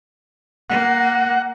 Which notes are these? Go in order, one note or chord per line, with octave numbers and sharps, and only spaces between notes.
A#3 F#5